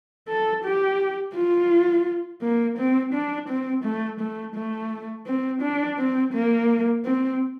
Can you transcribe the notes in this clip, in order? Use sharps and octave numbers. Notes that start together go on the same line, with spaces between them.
A4
G4
F4
A#3
C4
D4
C4
A3
A3
A3
C4
D4
C4
A#3
C4